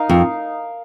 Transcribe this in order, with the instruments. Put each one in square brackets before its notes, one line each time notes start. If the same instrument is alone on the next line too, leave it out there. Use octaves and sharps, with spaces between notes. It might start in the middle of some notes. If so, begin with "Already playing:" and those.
Already playing: [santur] D#4 A#4 F5
[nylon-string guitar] F2